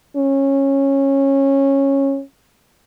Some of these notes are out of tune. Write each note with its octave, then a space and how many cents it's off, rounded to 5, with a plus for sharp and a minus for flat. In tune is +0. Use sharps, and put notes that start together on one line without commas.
C#4 -15